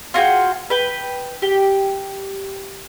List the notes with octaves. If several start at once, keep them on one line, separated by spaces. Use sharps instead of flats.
F4 F#4 G#4 G5
B4 G5
G4